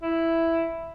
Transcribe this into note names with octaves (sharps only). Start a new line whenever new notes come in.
E4